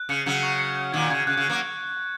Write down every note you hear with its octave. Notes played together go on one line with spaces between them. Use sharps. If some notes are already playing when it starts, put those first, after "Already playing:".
Already playing: F#6
C#3 C#7
C#3 F#3 C#7
C#6
C#7
C#7
A#2 D#3 G#6
C#3 G#6
C#3 F#6
C#3
F#6
F#3 A#3